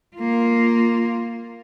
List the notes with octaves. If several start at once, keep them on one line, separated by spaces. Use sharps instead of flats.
A#3 F4